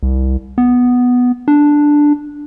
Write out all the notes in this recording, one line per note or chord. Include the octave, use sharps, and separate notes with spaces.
C2
B3
D4